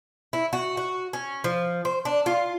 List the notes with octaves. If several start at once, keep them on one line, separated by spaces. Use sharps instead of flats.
E4
F#4
F#4
C#4
F3
C5
D4
F4